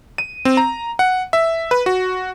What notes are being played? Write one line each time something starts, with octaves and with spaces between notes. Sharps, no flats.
D#7
C4
A#5
F#5
E5
B4
F#4